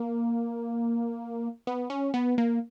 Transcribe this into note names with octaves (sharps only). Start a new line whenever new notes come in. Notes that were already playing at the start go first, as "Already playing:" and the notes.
Already playing: A#3
B3
C#4
B3
A#3